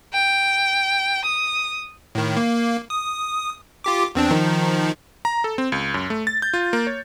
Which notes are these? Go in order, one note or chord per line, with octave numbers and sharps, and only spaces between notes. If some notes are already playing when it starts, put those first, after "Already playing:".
G5
D#6
A2 D#3
A#3
D#6
F4 G4 D6
E2 C4 D4
D#3 F3 D#4
A#5
A4
C4
C#2
F#2
A3
A6
G6
F4
A#3
C#5